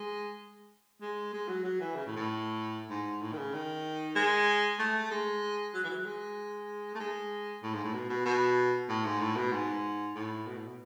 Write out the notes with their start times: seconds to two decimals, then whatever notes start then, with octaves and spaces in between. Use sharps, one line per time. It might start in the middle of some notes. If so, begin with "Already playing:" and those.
Already playing: G#3
1.02 G#3
1.33 G#3
1.48 F#3
1.65 F#3
1.80 E3
1.95 C#3
2.06 A2
2.16 A2
2.90 G#2
3.22 A2
3.32 D#3
3.38 C#3
3.54 D#3
4.16 G#3
4.79 A3
5.11 G#3
5.74 F#3
5.84 E3
5.89 F#3
6.06 G#3
6.95 A3
7.00 G#3
7.63 A2
7.74 G#2
7.84 A2
7.94 B2
8.09 B2
8.26 B2
8.89 A2
9.05 G#2
9.21 A2
9.36 B2
9.52 G#2
10.15 A2
10.47 B2
10.57 A2
10.67 B2